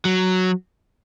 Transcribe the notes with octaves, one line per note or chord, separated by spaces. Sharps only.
F#3